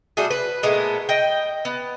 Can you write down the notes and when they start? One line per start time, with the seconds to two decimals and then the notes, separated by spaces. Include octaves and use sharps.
0.17 G3 A3 F#4 G#4
0.30 B4
0.63 A#2 G#3 A3 B3
1.09 D#5 G5
1.65 B3